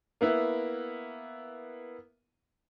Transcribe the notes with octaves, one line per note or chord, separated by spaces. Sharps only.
A#3 B3 E4